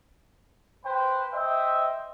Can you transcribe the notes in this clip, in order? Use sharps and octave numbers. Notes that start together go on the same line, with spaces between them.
B4 C5 G5
C5 D#5 E5 G5